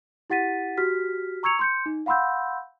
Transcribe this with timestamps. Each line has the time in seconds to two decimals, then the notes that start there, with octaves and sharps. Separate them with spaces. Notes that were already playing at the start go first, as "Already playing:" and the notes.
0.30 E4 G4 F#5 A6 B6 D#7
0.77 F#4 G4 F6 B6
1.43 A#5 C#6 E6 G#6 C#7 F7
1.59 C6 G6 C#7
1.86 D#4
2.06 F5 F#5 B5 C6 E6 G6